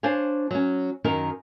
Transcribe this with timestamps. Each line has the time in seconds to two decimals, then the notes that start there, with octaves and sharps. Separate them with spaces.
0.03 D4 C5 C#5 F5 G#5
0.51 F#3 C#4
1.04 F#2 D#3 D#4 A#4